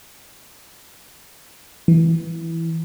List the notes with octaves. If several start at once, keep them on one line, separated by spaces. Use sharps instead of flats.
E3